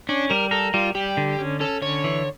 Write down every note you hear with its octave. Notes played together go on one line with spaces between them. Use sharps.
C#4 D4
G3 A#4
A4 A#4
G3 F4
G3 G4
D3
C#4
C#4 A4
D3 C#5
E3